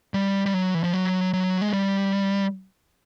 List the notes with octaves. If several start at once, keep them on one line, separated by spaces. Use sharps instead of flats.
G3
G3
F#3
E3
F3
F#3
F#3
G#3
G3